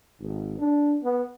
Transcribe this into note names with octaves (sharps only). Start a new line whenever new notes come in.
G#1
D4
B3